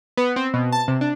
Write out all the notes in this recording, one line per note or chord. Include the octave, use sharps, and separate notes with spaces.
B3
C4
B2
A5
C3
D4